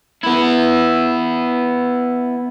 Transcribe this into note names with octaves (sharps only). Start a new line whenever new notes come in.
B3 E4